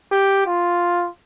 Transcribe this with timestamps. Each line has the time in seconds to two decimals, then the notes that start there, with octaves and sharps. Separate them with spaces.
0.12 G4
0.46 F4